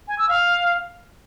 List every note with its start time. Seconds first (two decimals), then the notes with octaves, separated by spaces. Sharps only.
0.08 G#5
0.18 E6
0.29 F5